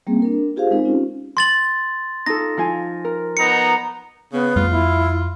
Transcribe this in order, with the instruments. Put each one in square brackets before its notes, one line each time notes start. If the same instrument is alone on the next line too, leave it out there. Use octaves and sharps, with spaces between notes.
[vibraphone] G3 A#3 C4 C#4 G#4
D4 A#4
F4 G4 G#4 C5 F5
G#3 C4 D#4 A#4 C5
C#4 F4 G4
[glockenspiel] C6 A6 F#7
[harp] D#4 F4 A4 [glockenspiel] A#6
[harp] F3 F4 G#5
A#4
[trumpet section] B3 D#4 A#5 [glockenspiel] C#7
[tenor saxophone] C#3 [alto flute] B3
[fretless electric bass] F2 G3 A3 [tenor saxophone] F4
[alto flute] E4